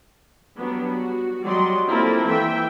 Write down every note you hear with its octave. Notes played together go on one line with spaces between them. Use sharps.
F#3 G3 B3 D4
F#4
F#3 G3 D5 D#5 C6
A#3 C4 E4 F4 A4 A#4
E3 E5 G5